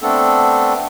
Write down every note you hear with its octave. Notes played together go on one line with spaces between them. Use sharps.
A3 B3 C4 D4 A4